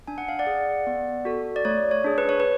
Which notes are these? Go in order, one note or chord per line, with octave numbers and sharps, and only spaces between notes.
D4 G#5
F#5
F5
D5 F#5
G#4
B3
F#4 A4
D5
A3 C#5
C#5
D4 G#4
B4
C#5
B4